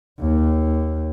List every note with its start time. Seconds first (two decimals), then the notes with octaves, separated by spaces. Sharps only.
0.20 D#2